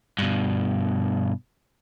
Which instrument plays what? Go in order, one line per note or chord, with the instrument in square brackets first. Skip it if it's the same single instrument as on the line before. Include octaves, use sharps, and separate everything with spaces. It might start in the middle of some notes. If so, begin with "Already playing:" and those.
[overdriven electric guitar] G2 B2